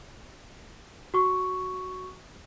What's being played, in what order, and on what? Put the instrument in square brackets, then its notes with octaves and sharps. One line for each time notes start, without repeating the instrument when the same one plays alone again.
[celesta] F#4 C#6